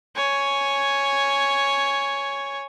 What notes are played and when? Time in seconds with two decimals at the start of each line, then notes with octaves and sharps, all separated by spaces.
0.16 C#5 G#5